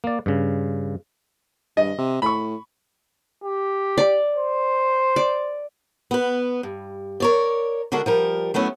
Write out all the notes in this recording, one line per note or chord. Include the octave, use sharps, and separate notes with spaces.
A#3 D5
G2 C#3
G2 D#5
C3
A2 B5 C#6
G4
D5
C5
D5
B3 B4
G2
A#4 C#5 D5
D3 G#3 D4 F#4 A#4
F3 G3 A#4
F#3 A3 B3 C#4 E4